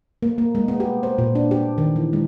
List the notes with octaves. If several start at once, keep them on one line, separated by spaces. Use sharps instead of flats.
A#3
A#3
G#3
B3
G4
C5
A#2
D4
G4
D#3
E3
G#3